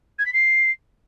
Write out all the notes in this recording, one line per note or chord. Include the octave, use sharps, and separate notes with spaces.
G#6
B6
C7